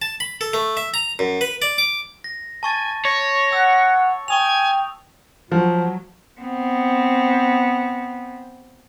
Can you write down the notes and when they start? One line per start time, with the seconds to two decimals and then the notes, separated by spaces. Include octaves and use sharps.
0.02 A5
0.20 B5
0.41 A4
0.54 A3
0.77 E5
0.94 A#5
1.19 F#2
1.41 B4
1.62 D5
1.78 D6
2.24 A#6
2.63 G#5 A5 C#6 A6
3.05 C#5 A#6
3.52 F#5 E6
4.28 G5 G#5 C#6 D#6 F7
5.52 F3 F#3
6.41 B3 C4